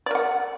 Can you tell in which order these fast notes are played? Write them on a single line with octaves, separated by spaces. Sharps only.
D5 A#4 F#5